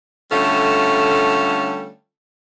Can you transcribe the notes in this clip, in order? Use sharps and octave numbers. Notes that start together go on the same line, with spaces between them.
D3 G3 A3 C#4 F4 A4